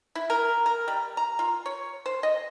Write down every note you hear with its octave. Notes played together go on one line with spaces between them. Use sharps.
E4
A#4
A#4
G3
A#5
F4
C#5
C5
D#5